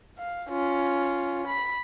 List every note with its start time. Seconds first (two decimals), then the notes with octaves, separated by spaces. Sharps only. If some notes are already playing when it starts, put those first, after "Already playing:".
0.19 F5
0.50 C#4 F4
1.48 B5